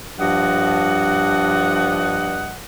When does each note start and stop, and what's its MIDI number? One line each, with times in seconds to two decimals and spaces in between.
0.19 2.55 43
0.19 2.55 53
0.19 2.55 75
0.19 2.55 78